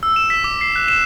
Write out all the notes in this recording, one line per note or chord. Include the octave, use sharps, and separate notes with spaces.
E6
E7
B6
D6
C7
F#6
E7